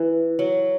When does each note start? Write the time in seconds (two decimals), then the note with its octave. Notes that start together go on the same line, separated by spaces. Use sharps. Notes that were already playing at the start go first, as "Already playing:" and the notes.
Already playing: E3
0.39 F#3